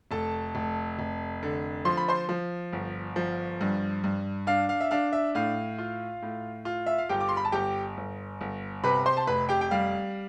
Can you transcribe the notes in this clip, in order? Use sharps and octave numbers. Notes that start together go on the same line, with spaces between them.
F1 A4 A5
F1
F1
D3
F3 C6
B5
C5 C6
F3
G1
F3
G2
G2
D4 F5
F5
E5
D4 F5
E5
A2 F5
F4
A2
F4
E5
F5
G1 G4 G5
D6
C6
B5
A5
G1 G4 G5
G1
G1
C3 B4 B5
C5 C6
A5
F1 B4 B5
G4 G5
G5
G3 F5